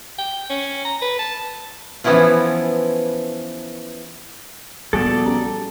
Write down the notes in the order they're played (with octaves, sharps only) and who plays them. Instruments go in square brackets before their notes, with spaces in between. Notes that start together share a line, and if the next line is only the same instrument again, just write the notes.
[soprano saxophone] G5
C#4
A#5
B4
A5
[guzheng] E3 F3 B3 C#4 E4 F4
[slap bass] A#1 G3 B3 [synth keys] F#4 G#4 [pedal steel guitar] A4 D5 A5
[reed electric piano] C#4 G4 A#5